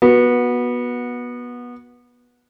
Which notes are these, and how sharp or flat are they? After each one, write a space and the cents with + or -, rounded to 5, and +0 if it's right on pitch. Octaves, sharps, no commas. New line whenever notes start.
B3 -20 F#4 -15